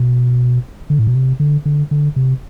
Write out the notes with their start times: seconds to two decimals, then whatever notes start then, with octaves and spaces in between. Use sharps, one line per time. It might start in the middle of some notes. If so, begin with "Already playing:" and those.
Already playing: B2
0.90 D3
0.99 A2
1.07 B2
1.15 C3
1.40 D3
1.66 D3
1.91 D3
2.16 C3